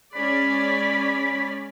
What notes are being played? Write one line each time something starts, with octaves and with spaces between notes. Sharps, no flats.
G#3 C#4 D5 B5